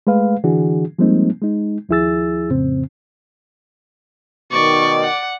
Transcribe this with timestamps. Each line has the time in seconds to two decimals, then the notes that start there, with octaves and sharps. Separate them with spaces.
0.07 G#3 A3 B4 F5
0.44 D3 E3 D4 F#4 G#4
0.99 F3 G3 G#3 A#3 C4 D#4
1.42 G#3 D#4
1.89 D#2 F3 E4 G#4 E6 A6
2.50 F2 A2 C#3 C4
4.52 B2 D#3 D5 C#6
5.04 F#5